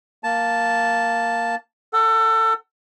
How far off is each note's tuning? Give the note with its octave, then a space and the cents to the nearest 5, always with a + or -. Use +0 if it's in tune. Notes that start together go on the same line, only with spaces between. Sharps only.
A#3 +0 A5 +0
A4 +25 F#5 +20